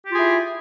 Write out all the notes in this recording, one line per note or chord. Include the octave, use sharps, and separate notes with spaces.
E4 F4 G4 G#4